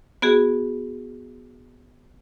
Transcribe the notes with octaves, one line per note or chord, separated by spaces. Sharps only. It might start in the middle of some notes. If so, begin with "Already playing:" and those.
B3 F#4 G#4